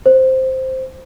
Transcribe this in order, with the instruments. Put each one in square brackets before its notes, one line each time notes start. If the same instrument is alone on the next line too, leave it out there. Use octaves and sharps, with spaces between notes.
[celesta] C5